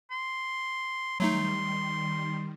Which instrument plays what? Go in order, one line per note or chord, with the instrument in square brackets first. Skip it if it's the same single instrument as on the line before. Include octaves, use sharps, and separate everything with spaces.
[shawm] C6
[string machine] D#3 G3 [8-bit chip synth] F#3 A3 D#4 [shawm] C6